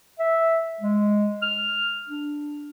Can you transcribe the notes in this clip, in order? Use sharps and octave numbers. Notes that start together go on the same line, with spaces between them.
E5
G#3
F6
D4